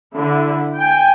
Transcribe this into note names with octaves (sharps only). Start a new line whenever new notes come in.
D3 E4
G5 G#5